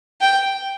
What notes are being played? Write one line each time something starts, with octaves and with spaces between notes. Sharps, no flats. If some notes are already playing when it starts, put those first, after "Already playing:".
G5